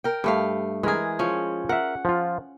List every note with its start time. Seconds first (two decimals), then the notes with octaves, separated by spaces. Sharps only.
0.04 A#4 G5
0.24 G2 A3 F5
0.83 E3 G#3 G#4 A#4
1.19 F3 C#4
1.69 A#4 E5 F#5
2.05 F3 F4